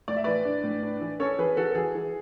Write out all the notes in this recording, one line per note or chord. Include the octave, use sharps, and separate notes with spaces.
A2 D5
E5
E3 B4 D5
D4
A2
D4
E3
C#4 A4 C#5
E3 G#4 B4
E3 F#4 A4
A4
E3 G#4
E3